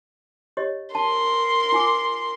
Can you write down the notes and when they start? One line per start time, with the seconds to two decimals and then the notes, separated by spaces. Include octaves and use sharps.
0.57 G4 C#5 D#5
0.95 A#4 A5 C6
1.72 F4 G#5 D6